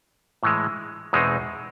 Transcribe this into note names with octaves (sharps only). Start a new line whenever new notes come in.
A2 E3 G#3
E2 B2 G#3 C4 D#4